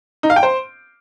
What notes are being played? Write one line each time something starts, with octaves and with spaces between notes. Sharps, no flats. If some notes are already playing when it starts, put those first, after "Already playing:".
D#4
F5
G5
C5